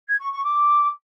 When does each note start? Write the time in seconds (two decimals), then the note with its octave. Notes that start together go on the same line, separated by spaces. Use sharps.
0.08 G#6
0.20 C#6
0.32 C#6
0.43 D6